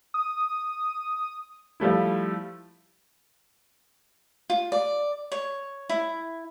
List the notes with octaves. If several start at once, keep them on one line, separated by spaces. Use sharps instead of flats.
D#6
F3 G3 A3 E4
F4
D5
C#5
E4